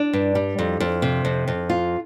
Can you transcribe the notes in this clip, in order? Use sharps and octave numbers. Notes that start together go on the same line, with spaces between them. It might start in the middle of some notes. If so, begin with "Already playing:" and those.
Already playing: D4
G2
G3
F2
F2
C3
F2
F2
F4